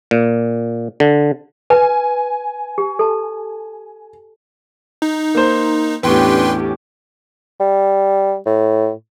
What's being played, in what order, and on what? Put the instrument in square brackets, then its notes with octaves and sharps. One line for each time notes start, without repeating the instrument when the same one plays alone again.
[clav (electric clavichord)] A#2
D3
[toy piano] B4 [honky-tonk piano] G#5
[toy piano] G4
A4 A5
[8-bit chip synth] D#4
[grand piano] A#3 C5
[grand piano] E2 A2 [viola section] C#4 D4 G4 [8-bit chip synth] B4 G5 C6
[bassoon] G3
A2